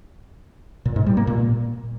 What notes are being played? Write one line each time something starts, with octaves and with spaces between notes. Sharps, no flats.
A#2
G#2
G3
A#3
A#2